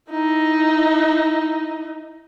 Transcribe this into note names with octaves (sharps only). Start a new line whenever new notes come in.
D#4 E4